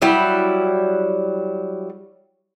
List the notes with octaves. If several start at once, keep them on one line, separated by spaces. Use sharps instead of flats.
F#3 G3 E4